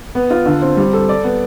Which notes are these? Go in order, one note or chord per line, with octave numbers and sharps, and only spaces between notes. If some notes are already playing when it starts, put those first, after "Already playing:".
B3
F4
D3
C4
G3
A4
D5
B3